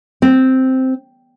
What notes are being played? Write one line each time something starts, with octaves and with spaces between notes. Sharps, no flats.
C4